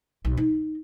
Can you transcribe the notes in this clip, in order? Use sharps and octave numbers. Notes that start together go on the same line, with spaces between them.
B1
D#4